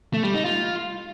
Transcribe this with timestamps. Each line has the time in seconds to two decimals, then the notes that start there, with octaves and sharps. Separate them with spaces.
0.14 A3
0.24 G3
0.34 D#4
0.45 F4